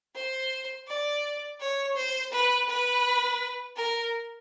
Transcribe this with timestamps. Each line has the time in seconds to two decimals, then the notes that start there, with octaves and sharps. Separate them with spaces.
0.16 C5
0.88 D5
1.61 C#5
1.96 C5
2.33 B4
2.69 B4
3.77 A#4